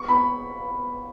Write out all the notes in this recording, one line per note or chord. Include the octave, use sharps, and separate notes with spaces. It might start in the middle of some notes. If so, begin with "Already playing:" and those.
Already playing: C#6
B5